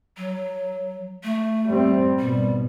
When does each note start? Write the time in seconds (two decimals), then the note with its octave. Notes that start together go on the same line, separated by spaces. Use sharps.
0.17 F#3
1.24 A3
1.66 G3 C4
2.19 G#1 B2 G3